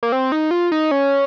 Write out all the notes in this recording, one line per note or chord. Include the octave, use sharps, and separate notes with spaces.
A#3
C4
D#4
F4
D#4
C#4